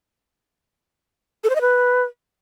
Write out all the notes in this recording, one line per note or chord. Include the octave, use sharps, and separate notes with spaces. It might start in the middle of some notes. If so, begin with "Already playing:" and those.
A4
C5
D#5
B4